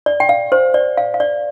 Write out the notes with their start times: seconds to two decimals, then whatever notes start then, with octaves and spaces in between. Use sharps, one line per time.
0.06 D5
0.20 G5
0.29 F5
0.52 C5
0.74 D5
0.97 F5
1.14 F5
1.20 D5